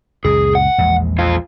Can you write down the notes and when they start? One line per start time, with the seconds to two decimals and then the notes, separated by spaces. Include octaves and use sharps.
0.25 C#2 F#2 A#2 G#4
0.55 F#5
0.78 A#1 E2 G#3
1.19 F2 F4